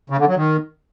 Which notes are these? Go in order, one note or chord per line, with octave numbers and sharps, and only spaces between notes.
C#3
D3
F#3
D#3